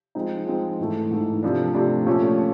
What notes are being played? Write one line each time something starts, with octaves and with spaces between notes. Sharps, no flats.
F3 G#3 C4 D#4
F3 G#3 C4 D#4
G#2 E3 A3
G#2 E3 A3
C3 F3 A3 D4
C3 F3 A3 D4
A#2 F3 A3 C#4
C#4